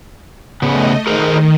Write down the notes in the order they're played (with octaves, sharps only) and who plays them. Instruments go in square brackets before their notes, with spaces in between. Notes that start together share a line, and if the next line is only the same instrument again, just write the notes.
[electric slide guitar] C#3 B3 [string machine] A3 D#5
[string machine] D#3 [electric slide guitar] G#4 A#4 C5